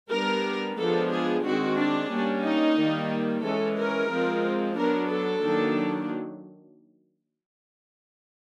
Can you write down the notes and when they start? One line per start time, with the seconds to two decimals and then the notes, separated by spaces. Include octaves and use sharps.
0.11 G3 B3 D4 A#4
0.78 F3 G#3 B3 D4 A4
1.11 G#4
1.45 D#3 G#3 C4 F#4
1.77 D4
2.10 G3 A#3 C#4
2.44 D#4
2.78 D#3 G3 A#3
3.43 E3 G#3 C#4 A4
3.78 A#4
4.11 F3 G#3 C4
4.77 F#3 B3 D4 A#4
5.10 A4
5.43 D#3 F#3 A#3 D4